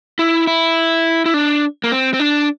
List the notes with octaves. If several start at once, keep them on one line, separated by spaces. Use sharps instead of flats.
E4
E4
E4
D4
A#3
C4
C4
D4